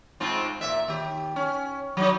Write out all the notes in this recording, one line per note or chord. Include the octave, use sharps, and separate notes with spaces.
G#2 C4 F4
A#2 E5
D#2 G4
C#4
F#3 D#4